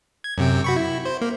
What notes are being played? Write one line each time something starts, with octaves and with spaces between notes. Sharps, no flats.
G#6
F#2 C3 G5
F#4 B5 C#6
E4
C5
A#3